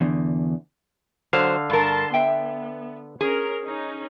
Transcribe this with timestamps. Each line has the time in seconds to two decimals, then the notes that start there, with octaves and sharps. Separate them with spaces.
0.01 E2 D3
1.33 D3 F#3 C5 F5
1.70 G2 A#4 A5 C6
2.14 B3 E5 G5
3.21 C#4 G#4 A#4
3.64 C#4 D#4